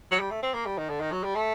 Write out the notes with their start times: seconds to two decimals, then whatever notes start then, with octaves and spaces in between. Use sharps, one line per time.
0.11 F#3
0.20 G3
0.31 A3
0.43 C4
0.54 A#3
0.66 G3
0.78 D#3
0.90 D3
1.00 D#3
1.12 F#3
1.24 G3
1.35 A3